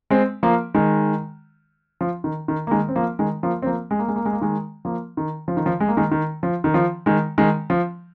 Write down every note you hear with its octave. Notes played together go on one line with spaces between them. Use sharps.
G#3 C4
F3 A#3
D#3 G#3
F3
D#3
D#3
A#3
D#3 G#3
C4
F3 A#3
D#3 G#3
F3 A#3
C4
F3 A#3
G#3
A#3
G#3
A#3
G#3
A#3
D#3 G#3
F3 A#3
D#3
F3
D#3
F3
G#3
A#3
D#3 G#3
D#3
F3
D#3
F3
D#3 G#3
D#3 G#3
F3